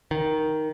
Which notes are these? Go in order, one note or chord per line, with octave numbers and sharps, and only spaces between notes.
D#3